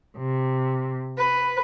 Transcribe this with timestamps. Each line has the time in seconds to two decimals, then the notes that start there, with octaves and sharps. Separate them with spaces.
0.17 C3
1.17 B4